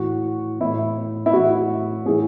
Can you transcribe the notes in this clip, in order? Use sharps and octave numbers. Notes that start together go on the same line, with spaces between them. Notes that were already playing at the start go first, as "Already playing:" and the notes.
Already playing: A2 E3 F#4
A2 E3 E4
E4
A2 E3 F#4
A2 E3 G#4